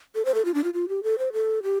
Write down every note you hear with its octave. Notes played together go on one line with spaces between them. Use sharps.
A4
C5
A4
F4
D4
F4
F4
G4
A4
C5
A4
G4